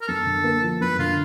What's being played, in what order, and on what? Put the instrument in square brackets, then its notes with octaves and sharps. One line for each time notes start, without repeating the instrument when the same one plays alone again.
[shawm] A#4
[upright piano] F#2 [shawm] A4
[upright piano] D3
A#3
F3
[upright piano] F#2 [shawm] B4
[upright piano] D3 [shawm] F4